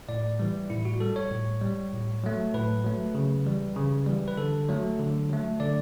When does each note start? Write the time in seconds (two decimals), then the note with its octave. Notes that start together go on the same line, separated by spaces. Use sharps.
0.09 A2 D5
0.40 E3 G3
0.70 A2 E4
0.85 F#4
1.00 G3 A4
1.16 C#5
1.31 A2
1.61 G3
1.93 A2
2.24 F#3 A3
2.54 A2 B4
2.84 F#3 A3
3.15 C#3
3.46 E3 G3
3.76 C#3
4.07 E3 G3
4.28 B4
4.38 D3 A4
4.69 F#3 A3
4.99 D3
5.29 F#3 A3
5.60 D3 D5